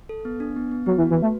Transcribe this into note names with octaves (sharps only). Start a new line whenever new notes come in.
A4
B3
D4
B3
B3
F#3 B3
E3
F#4
E3
A3 B4